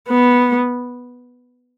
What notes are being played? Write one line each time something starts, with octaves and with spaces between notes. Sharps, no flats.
B3